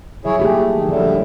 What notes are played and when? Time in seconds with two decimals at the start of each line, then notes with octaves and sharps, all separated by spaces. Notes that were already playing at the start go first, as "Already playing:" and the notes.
0.25 F#3 E4 G#4 C#5 E5
0.40 A3 A#3 G4 G#4
0.73 D#3
0.89 A2 D3 F3 G3 E5